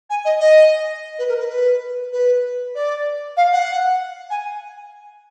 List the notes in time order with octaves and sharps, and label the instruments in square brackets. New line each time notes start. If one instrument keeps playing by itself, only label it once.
[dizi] G#5
D#5
D#5
B4
A#4
B4
B4
B4
D5
F5
F#5
G#5